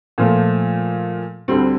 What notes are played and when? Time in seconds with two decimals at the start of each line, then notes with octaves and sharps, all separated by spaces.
0.18 A#2 F3 A3
1.48 D2 D3 G3 C4